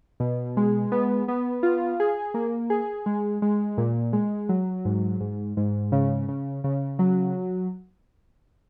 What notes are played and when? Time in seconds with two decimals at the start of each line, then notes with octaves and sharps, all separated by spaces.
0.20 B2
0.57 G#3
0.92 B3
1.28 B3
1.63 F4
2.00 G#4
2.34 A#3
2.70 G#4
3.06 G#3
3.42 G#3
3.78 A#2
4.13 G#3
4.49 F#3
4.85 G#2
5.20 G#2
5.57 G#2
5.92 C#3
6.28 C#3
6.64 C#3
6.99 F#3